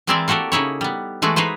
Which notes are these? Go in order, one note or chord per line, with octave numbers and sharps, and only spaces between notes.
E3 G#3 C4 E4 A#4 D5
A#3 F#4 G4 A4 A#4
C#3 D#4 E4 C#5
G3 B3
E3 G#3 A3 F#4 D5
D#4 G#4 B4 C5